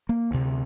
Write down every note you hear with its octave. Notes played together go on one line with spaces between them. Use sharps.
A#3
D2 C3